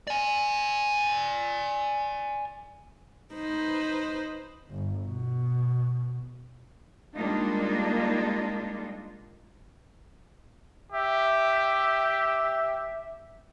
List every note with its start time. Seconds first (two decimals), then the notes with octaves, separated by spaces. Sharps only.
0.07 D5 G#5
3.34 D#4 B4 C5
4.70 G1
5.06 B2
7.15 G3 G#3 A#3 D4 D#4 F4
10.92 G4 E5